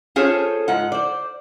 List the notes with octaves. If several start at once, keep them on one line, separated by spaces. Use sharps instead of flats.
C#4 F4 G#4 A4 C5 C#5
G#2 G#3 F4 F#5
C5 D5